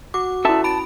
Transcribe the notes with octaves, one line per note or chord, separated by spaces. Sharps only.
F#4 D6
C#4 E4 A4 E5 A5
A5 B5 D7